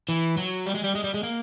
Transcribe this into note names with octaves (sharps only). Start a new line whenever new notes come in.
E3
F#3
G3
G#3
G3
G#3
G3
G#3
A#3